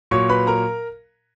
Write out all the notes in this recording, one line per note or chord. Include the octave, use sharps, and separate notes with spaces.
A#2 F#3 C#5 C#6
B4 B5
A#4 A#5